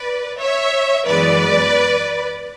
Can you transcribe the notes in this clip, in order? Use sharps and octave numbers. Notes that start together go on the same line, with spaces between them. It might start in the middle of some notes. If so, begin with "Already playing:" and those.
Already playing: B4 D5
C#5 E5
F#2 E3 G#3 B3 B4 D5